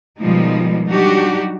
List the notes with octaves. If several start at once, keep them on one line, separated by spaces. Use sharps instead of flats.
B2 D#3 F3 G3 G#3 D#4
F#3 G3 D4 D#4 F#4 G4